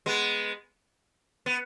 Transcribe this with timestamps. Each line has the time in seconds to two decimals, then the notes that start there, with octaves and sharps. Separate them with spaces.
0.06 G#3 B3
1.46 B3